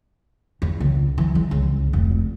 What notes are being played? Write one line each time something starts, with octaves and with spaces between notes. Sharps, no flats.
E2
C#2
E3
G#3
C#2
F1